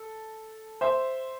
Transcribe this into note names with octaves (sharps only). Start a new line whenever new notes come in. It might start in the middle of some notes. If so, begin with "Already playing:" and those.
Already playing: A4
C5 E5